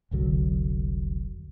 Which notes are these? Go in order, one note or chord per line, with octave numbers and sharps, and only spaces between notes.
F1 C2 D3 F#3